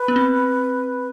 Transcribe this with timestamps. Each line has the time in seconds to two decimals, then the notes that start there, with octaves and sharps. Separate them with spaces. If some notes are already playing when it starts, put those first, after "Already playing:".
Already playing: B4
0.08 B3
0.16 C4